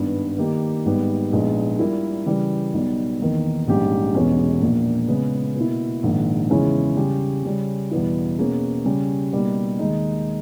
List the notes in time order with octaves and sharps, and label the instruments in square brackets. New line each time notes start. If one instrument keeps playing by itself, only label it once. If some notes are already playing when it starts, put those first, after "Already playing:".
Already playing: [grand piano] G#1 G2 G3 B3
D#3 A#3 D#4 G4
G#1 G#2 G3 B3 G4
A#1 A#2 G#3 B3 D#4
A#2 G3 A#3 E4 A#4
C#3 E3 G3
B1 B2 G3
E2 D#3 A#3 D#4
A#1 G#2 G3 C#4 G4
E1 E2 B2 G#3 C#4
A#1 A#2 A#3
C#3 G#3 B3
B2 A#3 E4
A#1 G#2 D#3
E2 C#3 G#3 C#4 E4
C#3 G3 C#4 G4
C#3 G3 C#4
E2 B2 G3 B3 E4
B2 A#3 C#4 G#4
C#3 G3 C#4 G4
B2 G3 A#3 D#4 G4
D#2 D#3 G#3 D#4